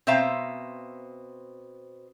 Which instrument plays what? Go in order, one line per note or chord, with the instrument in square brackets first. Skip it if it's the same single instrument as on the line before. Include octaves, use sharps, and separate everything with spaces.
[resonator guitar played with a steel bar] B2 C4 C5 E5 F5 A#5